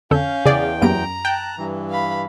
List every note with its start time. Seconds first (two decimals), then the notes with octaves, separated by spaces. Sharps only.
0.11 F2 D3 C#4 A4 F5 G6
0.45 E2 C#3 G#4 D5 G5
0.82 F#2 A#3 B3 G4 A#5 D7
1.25 G5 A5 F#6
1.58 G2 E3
1.90 F5 B5